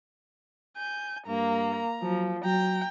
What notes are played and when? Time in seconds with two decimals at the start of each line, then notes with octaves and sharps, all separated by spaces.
0.77 G#5 G6
1.27 G2 A#3 A#5
2.02 F3 F#3
2.45 F#3 G5 A#5